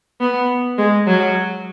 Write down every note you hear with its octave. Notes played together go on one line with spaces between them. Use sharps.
B3
G#3
F#3